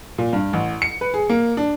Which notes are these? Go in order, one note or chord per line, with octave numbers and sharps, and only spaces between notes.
A#2
G2
A1
C#7
B4
G#4
A#3
D4